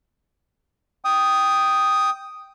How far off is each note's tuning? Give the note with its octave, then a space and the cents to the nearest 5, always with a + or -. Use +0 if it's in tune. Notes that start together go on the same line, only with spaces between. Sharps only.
G5 +0 D#6 +0